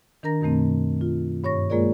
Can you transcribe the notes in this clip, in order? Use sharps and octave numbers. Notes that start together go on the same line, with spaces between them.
D#3 D4 A#4 A#5 A#6
F#2 B2 D#3 A3 C4
F4
G2 C#5 C#6 A#6
G#3 A#3 F4 G#4 A#4 D5